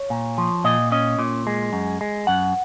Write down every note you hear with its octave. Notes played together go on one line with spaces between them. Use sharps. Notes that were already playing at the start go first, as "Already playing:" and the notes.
Already playing: C#5
A#2
F3
A#2 D#5
C#4 D#5
A#2
G#3
F#2
G#3
F#2 F#5